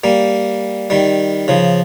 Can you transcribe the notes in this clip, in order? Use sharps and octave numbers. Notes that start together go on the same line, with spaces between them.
G3 A#3
D#3 G3
C#3 F3